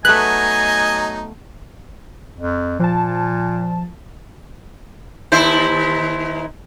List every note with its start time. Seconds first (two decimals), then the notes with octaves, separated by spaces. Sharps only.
0.05 F#3 A3 B3 D#4 B4 D#5 G#5 F#6
2.38 F2
2.79 A#2 F3 A5
5.32 D#2 E4 C5